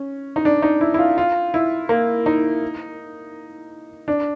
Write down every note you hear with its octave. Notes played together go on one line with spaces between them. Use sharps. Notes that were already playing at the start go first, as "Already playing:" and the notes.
Already playing: C#4
D#4
D4
D#4
E4
E4
F4
F4
E4
A#3
D#4
D4